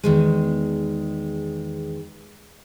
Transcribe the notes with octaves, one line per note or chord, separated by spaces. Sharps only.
E2 D#3 G#3